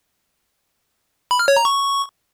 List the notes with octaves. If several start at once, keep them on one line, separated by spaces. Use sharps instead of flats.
B5
F6
C#5
A#5
C#6